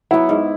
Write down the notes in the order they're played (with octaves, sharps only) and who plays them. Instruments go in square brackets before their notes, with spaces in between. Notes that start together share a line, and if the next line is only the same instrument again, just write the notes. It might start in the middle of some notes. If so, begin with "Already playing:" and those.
[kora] F#3 B3 [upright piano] E4
[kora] G#2